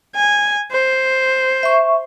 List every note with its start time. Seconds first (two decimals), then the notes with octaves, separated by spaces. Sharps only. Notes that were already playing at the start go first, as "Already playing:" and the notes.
0.15 G#5
0.71 C5
1.63 E5 C#6